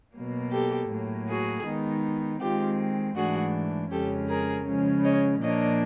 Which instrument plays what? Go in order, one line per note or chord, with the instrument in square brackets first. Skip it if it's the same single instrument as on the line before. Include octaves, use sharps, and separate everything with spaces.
[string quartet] B2 F#3 A#3
G4 A4
A2 F#3 A#3
F#4 G#4
D#3 G#3 B3 D#4
D#3 G#3 C4 F4 G4
G#2 E3 A3 D4 F#4 G#4
F2 C#3 F3 G#3 C#4 G4 A4
G#4 A#4
C#3 F3 G#3 C#4
C#5 D#5
A#2 F3 A#3 D4 C#5 D#5